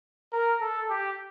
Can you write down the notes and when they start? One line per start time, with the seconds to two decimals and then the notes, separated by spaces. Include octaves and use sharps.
0.33 A#4
0.60 A4
0.90 G4